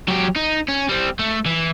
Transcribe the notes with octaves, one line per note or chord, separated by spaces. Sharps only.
F#3 G4
D#4
C#4
G3 C4
A3
E3